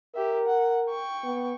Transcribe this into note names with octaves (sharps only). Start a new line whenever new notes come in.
G4 A#4 E5
F#5
G5 C#6
B3